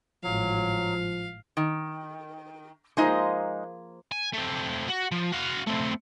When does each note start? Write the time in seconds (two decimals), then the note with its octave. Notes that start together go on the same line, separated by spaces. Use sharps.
0.23 G#1 A2 F3 F#3 F5
1.57 D#3
2.97 F3 G#3 A#3 D#4 G#4 D#5
4.12 G#5
4.33 A3 C4
4.88 F#4
5.12 F3
5.32 F#4 F5
5.67 A3 C4